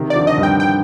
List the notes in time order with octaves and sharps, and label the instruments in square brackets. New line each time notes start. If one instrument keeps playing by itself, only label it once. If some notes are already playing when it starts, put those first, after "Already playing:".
Already playing: [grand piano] C3 D#3
[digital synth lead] D5
[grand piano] D3 F3
[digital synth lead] D#5
[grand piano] G2
[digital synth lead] G5
G5